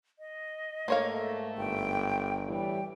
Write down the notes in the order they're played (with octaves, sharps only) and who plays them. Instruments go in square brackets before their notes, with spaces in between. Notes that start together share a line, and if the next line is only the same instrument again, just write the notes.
[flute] D#5
[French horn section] G#2 A3 [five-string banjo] A#3 C#5 F5
[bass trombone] G1 [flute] G5
[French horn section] A2 E3 G3 [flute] G5